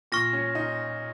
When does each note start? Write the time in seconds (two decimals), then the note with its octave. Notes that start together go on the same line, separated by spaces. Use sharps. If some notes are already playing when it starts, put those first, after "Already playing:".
0.12 A#2 C#6 F6 A#6
0.33 C#4
0.55 D#4